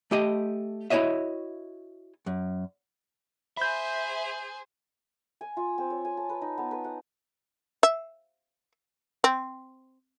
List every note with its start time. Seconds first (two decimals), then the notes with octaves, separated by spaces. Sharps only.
0.11 A3 G4 D#5
0.90 E4 F#4 C#5 D#5 E5
2.26 F#2
3.57 G#4 C5 E5 B5 G6
5.41 G#5
5.57 F4
5.78 C4
5.90 C#5
6.05 G#5
6.17 A5
6.29 B4
6.41 D#4
6.58 B3
6.71 B4
6.84 F#5
7.83 E5
9.24 C4